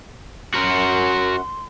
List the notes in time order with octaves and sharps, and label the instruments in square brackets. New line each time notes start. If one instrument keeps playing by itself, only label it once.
[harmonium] F#2 C#4 F#5 [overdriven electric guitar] F#4 A#4 [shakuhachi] C6